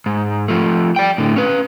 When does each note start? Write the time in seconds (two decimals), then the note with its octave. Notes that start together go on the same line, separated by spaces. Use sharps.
0.06 G#2
0.48 F3 A3
0.96 D5 G5
1.18 A2 D3
1.36 C#4 B4